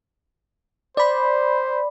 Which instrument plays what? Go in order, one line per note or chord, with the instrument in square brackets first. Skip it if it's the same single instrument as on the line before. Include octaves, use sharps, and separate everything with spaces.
[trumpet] C5 [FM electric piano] D5 B5